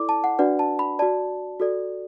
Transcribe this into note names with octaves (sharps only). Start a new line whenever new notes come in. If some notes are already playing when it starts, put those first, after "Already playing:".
Already playing: E4 A4 D5 D6
A5
F#5
D4 F#4 B4 D5 F#5
A5
B5
F#4 D5 A5
F#4 A4 D5